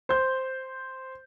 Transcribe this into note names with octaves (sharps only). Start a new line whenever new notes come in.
C5 G6